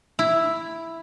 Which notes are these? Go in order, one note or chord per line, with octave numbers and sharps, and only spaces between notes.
E4